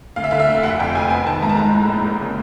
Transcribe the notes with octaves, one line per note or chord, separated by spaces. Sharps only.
D2 F5
E5
D3 F5
E5
D2
F1 F#5
F2 G5
F1 G#5
B3 G#5
D#3 A5
G#2 A#5
A5
G#3 A#5
A2
A#1
A#3
C#3